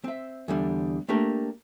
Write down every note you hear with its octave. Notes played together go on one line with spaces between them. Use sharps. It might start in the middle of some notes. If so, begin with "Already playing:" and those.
C4 E5
E2 D3 G3
A3 A#3 D4 G4 A#4